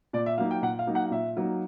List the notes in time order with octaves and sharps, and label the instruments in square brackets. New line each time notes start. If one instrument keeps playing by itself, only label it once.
[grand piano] A#2 D5
E5
F#3 A#3 D#4 F5
G5
A#2 F#5
F5
F#3 A#3 D#4
F#5
A#2 E5
F#3 A#3 D#4